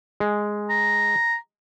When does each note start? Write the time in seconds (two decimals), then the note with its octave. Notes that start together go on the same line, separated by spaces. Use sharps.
0.20 G#3
0.70 A#5